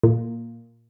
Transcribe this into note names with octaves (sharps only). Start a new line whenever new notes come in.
A#2